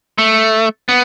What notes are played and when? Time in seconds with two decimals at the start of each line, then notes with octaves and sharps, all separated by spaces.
0.18 A3
0.89 B3